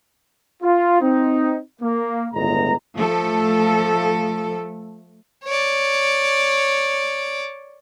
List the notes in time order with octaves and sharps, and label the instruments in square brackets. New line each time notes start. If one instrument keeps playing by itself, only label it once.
[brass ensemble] F4
C4 D#4
A#3
G1 C#2 A2 G#3 B3 A#5
[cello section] F3 A3 A4
[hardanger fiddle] C#5 D5